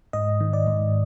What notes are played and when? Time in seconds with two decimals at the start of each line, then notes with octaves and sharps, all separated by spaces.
0.13 G#2 D#5
0.40 D#3
0.53 D5
0.67 G#2